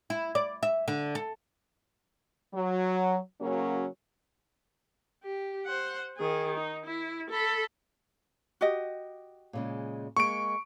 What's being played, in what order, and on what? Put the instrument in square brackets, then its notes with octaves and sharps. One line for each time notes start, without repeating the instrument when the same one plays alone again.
[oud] E4
D5
E5
D3
A4
[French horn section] F#3
C#3 F#3 A#3 C#4 F#4
[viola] G4
C5 F#5
D#3 G#4
D#4
E4
A4 B5
[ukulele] F#4 G4 D#5
[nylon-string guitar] A#2 C#3 G#3
[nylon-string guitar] G#3 A#3 [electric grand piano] C#6 D7